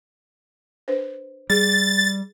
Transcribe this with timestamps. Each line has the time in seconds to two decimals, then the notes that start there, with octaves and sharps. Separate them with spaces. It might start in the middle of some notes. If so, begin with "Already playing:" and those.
0.88 D4 B4 C5
1.50 G3 G#4 A6